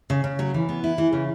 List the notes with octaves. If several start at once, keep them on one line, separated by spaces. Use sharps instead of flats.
C#3
C#3
F#3
E3
B3
E4
E3
C#3